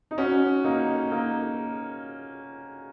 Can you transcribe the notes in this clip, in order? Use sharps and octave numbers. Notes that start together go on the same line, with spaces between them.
D#4
C#4 F#4
A#3 D#4
A#3 D#4